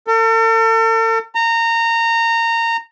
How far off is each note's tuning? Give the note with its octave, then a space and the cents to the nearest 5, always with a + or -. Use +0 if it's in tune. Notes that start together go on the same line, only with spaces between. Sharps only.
A4 +45
A#5 -20